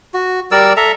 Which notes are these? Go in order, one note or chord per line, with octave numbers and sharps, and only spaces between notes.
F#4
G3 A#4 D5 E6
A4 E5 A#5